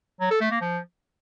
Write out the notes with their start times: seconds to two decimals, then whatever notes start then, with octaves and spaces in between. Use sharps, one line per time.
0.20 F#3
0.31 A4
0.41 A3
0.51 A#3
0.61 F3